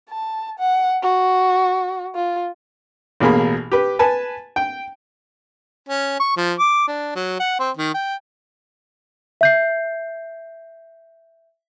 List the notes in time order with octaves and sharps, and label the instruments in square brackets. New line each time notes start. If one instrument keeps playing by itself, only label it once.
[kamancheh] A5
F#5
F#4
F4
[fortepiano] A1 B2 A#3 G#4 B5
G4 B4
B4 G#5 A5
G5
[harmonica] C#4
C#6
F3
D6
D4
F#3
F#5
C4
D#3
G5
[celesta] E5 G6 C7